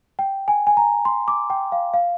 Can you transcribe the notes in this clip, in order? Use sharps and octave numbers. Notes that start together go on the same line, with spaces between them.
G5
G#5
G#5
A#5
C6
D6
G5
F5
F5